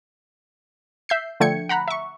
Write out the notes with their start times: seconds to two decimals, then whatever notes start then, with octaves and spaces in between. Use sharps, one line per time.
1.09 E5 G6 C7
1.40 D3 F3 A3 G5 G#6 C#7
1.69 F#5 A#5 B5 F#6
1.88 E5 C#6